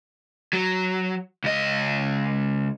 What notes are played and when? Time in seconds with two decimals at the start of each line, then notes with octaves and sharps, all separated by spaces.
0.53 F#3
1.44 C#2 D#5